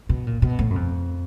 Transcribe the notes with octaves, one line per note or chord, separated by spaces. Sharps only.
B2
A#2
B2
A2
F#2
F2